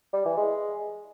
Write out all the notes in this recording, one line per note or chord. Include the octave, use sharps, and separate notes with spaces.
G3
E3
G#3